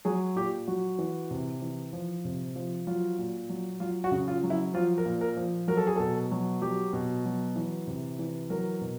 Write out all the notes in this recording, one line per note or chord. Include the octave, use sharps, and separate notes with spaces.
F#3 G#4
A#2 G4
F#3 F#4
E3
C3
E3
F3
C3
F3
F#3 F4
A#2
F#3
F#3 F4
F#4
C#3
F4
F#3
E4
F3 F4
A#4
A#2
A#4
F3
F#3 A#4
A4
G#4
B2 A4
F#3
F#3 G4
B2
F#3
E3
C3
E3
F#3 A#4
B2